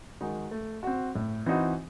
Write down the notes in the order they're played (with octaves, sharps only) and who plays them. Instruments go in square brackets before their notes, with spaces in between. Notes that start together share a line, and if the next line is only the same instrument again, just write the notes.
[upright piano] D#3 G#3 D#4 F#4
A3
C4 F#4
A2
E3 C4 D#4 F#4